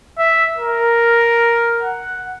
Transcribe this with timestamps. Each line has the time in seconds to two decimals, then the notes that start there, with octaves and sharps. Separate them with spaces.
0.18 E5
0.58 A#4
1.82 F#5